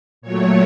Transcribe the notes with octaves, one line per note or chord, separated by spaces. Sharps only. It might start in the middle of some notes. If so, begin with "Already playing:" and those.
A#2 F#3 A3 C#5